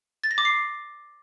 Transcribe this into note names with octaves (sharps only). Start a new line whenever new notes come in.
A6
A#6
D6
C7